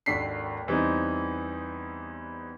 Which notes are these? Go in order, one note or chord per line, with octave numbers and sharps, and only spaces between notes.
G#1 D#2 D4 A4 B6 C7
E2 E3 G3 C4 D#4